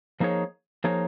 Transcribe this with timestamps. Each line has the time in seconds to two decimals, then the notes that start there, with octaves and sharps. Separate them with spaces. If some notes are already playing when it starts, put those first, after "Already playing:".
0.20 F3 A#3 D#4 G#4 C#5
0.84 F3 A#3 D#4 G#4 C#5